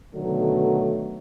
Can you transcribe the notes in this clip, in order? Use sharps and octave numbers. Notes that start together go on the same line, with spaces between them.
B2 D3 D#3 F#3 A3